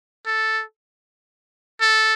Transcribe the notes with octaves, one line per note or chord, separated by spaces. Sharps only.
A4
A4